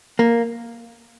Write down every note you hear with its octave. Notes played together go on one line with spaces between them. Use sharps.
A#3